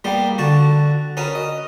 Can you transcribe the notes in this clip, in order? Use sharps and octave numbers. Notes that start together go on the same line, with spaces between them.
G3 A#3 B3 G4
D3 F#4 A5 C#6
C#4 F#4 A#4 B4 D#6
D#5